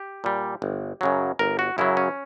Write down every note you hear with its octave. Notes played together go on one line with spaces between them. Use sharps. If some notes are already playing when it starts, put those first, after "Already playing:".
Already playing: G4
A#2 G3
G1
F#2 C#3 F#3
G1 A#4
F#4
F#2 C#3 F#3 E4
C#4